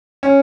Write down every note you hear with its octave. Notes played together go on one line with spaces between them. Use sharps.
C#4